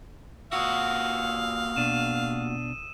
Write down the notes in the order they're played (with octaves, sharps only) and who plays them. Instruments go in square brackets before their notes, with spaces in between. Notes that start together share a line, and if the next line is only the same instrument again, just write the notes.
[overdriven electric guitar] A#2 F#4 [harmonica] F5 [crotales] D#6 E6
[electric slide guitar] B2 D4 [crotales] D#7 E7